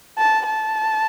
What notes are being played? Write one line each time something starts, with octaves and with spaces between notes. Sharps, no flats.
A5
A5